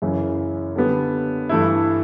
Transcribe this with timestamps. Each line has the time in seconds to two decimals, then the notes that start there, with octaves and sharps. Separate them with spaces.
0.02 F#2 C#3 E3
0.76 D3 G3 B3
1.49 G2 E3 A3 E4